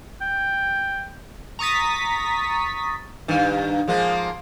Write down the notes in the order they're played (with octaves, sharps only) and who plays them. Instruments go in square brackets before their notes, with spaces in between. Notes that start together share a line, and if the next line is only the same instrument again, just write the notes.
[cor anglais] G5
[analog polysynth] A#5 C#6 D#6 A6 B6
[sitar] G2 D#3
F3 G#3 A#3